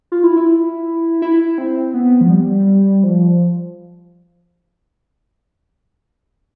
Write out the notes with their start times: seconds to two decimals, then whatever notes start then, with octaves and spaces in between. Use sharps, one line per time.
0.12 F4
0.24 E4
0.37 E4
1.22 E4
1.58 C4
1.94 B3
2.21 F3
2.30 G3
3.04 F3